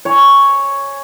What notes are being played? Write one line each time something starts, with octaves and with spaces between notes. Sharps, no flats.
C#5 G#5